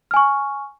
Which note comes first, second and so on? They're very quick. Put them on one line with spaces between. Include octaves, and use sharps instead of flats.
F6 G#5 C#6